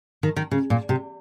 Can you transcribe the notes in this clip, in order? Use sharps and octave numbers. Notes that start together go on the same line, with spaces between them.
D#3
D#3
C#3
A#2
C3